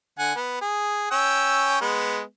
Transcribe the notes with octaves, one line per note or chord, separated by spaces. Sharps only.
D3 F#5 G#5
B3
G#4
C#4 G5 E6
G#3 B3